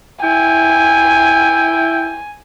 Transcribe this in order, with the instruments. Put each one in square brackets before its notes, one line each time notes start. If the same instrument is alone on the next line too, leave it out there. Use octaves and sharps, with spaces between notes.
[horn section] E4 G5 [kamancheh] G#5